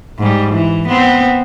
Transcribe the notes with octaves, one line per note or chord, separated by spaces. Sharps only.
G#2 G3
E3
B3 C4